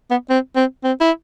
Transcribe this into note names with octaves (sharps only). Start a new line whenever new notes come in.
B3
C4
C4
C4
E4